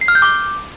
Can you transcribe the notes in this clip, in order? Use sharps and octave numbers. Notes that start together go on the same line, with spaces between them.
C7
F6
G6
D6